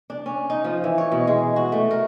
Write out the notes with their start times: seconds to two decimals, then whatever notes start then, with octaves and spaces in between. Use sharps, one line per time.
0.10 D4
0.26 C#4
0.50 D#4
0.64 F3
0.84 E3
0.98 C#5
1.12 B2
1.27 G#3
1.56 F#4
1.72 A3
1.91 A#4